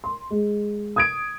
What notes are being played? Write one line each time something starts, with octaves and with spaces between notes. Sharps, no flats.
C6
G#3
D#6 G#6 D7